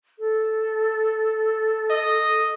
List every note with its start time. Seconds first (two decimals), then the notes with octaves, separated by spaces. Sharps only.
0.19 A4
1.90 D#5